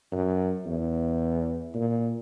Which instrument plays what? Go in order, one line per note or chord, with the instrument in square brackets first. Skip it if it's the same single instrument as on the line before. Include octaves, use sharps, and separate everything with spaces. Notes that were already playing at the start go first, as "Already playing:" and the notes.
[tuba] F#2
E2
A#2